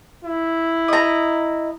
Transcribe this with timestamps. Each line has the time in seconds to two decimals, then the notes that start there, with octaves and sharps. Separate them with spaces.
0.24 E4
0.88 D#5 A#5